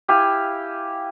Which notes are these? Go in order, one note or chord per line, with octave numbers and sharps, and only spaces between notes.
E4 G4 F5 G#5